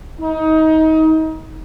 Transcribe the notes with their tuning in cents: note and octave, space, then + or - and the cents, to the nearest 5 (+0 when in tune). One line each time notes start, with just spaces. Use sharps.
D#4 +25